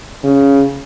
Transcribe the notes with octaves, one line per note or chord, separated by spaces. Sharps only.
C#3